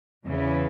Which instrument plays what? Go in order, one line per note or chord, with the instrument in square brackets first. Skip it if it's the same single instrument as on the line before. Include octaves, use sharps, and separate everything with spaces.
[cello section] E2 C#3 E3 B3 E4